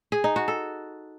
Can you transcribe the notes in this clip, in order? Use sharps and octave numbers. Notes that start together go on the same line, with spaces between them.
G#4
D#4
F#4
A4